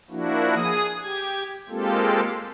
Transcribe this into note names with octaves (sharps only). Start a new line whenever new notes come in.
F3 A#3 D4 E4 F#4
G#4 D#6
G4 G#6
G#3 A#3 C4 F4 G4 A4